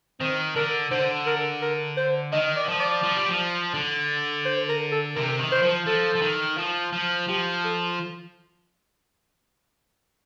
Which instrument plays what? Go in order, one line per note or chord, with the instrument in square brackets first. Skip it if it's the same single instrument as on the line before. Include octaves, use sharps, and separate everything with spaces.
[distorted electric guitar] D#3 [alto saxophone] C4
[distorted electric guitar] D3 [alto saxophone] A#4
[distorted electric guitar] D3 [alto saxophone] C5
[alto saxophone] A#4
A#4
C5
[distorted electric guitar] D#3 [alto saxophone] D#5
[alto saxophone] D5
[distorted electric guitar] F3
[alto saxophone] D5
[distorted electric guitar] F3
G3
F3
D3
[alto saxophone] C5
A#4
A4
[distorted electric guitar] C3 [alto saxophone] A#4
[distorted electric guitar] D#3
[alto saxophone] C5
[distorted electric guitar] F3
[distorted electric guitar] F3 [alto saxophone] A4
[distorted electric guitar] F3
D#3
F3
F3
[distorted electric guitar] F3 [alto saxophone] G4
[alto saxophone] A4